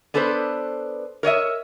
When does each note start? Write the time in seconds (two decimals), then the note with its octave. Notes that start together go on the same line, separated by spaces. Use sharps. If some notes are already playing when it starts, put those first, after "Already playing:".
0.14 B3 D4 A4 B4 C5
1.23 A#4 C#5 D#5 E5